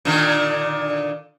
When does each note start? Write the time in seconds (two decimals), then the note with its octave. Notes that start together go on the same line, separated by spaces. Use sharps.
0.05 A#2 D3 D#3